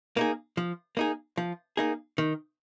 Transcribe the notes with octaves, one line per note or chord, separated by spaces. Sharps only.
A#3 D#4 G#4
F3
A#3 D#4 G#4
F3
A#3 D#4 G#4
D#3